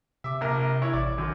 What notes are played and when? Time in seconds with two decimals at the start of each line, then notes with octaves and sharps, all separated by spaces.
0.24 C3 E5 D6
0.41 A#1 A#4
0.82 E4 C#5
0.93 A1 D5
1.18 F#2 D3 D#3